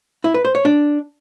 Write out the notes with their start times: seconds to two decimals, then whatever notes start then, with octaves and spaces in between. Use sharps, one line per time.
0.24 E4
0.34 B4
0.45 C5
0.55 C#5
0.65 D4